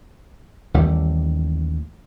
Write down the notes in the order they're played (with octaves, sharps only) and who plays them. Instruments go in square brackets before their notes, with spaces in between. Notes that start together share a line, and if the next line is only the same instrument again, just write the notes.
[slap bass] A1 D#2 G3 A3